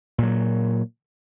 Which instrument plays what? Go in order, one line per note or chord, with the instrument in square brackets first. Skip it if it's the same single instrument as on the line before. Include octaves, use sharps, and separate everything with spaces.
[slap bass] A#2 F#3